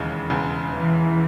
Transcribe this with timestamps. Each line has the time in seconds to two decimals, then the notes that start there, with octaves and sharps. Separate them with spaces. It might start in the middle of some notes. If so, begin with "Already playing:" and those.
Already playing: E1 D#2 C#3 E3 G#3
0.30 E1 E2 C#3
0.72 E3